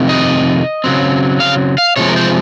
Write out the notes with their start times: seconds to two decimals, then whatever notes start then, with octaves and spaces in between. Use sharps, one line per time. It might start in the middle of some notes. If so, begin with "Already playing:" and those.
Already playing: F2 C3 D#3
0.09 D#5
0.84 C#3 F#3 C4
1.40 F5
1.78 F5
1.96 C3 F3 G#3 C#5
2.08 A#4
2.16 C5